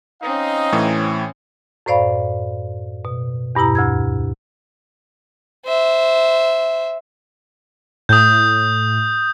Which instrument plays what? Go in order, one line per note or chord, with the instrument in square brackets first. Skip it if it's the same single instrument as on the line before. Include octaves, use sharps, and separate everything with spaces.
[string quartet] C4 C#4 [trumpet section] D#4 D#5 F5
[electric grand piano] A2 E3
[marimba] F#2 A2 C5 D5 F5 B5
B2
E2 G2 B2 E4 A#5
D2 E6 G#6
[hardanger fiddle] C5 E5
[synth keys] A2 [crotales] D#6 G6